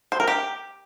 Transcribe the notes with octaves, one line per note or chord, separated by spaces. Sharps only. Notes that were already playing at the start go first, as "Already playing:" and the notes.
C5
A#4
G4